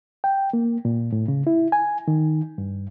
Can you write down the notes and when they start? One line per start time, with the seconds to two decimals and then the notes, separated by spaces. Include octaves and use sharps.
0.24 G5
0.53 A#3
0.85 A#2
1.12 A2
1.28 C#3
1.47 E4
1.72 G#5
2.08 D#3
2.58 G2